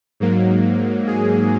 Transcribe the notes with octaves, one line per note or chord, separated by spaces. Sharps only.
G#2 F#3 A#3
G#4